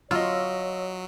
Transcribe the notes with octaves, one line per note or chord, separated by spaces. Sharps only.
F#3 F4 C#5 D#5 C#6 E6